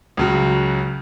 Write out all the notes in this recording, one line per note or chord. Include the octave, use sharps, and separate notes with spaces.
C#2 C#3 F#3